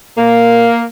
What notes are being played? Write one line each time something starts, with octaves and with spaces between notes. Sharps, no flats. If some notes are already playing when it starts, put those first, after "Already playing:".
A#2 A#3